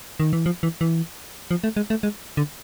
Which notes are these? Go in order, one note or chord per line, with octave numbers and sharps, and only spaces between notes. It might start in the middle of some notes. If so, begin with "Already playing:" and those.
D#3
E3
F3
E3
E3
F3
A3
G#3
A3
G#3
D3